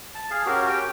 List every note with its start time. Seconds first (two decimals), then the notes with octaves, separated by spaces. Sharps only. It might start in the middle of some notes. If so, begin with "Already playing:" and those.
0.15 A5
0.31 G#4 F5
0.46 C#4 F#4 G4 A#4
0.68 G4 G5